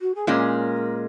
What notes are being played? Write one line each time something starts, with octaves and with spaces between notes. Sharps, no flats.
F#4
G#4
A#2 G#3 C#4 A#4